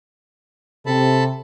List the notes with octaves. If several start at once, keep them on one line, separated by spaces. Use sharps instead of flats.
C3 A4 A5 B5